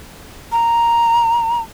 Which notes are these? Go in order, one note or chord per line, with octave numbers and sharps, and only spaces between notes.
A#5